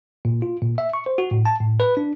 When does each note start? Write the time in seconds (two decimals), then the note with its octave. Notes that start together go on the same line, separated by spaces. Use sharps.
0.25 A#2
0.42 F4
0.62 A#2
0.78 E5
0.93 C#6
1.06 C5
1.18 F#4
1.31 A2
1.45 A5
1.60 A2
1.80 B4
1.97 D4